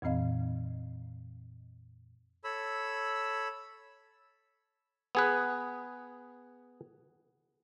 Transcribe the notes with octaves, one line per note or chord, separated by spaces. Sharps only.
F2 A#2 E3 C4 D#5 F5
A4 C#5 B5 E6
B3 G#4 B4